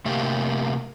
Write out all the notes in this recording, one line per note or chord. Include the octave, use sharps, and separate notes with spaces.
C3 A3 A#3 G4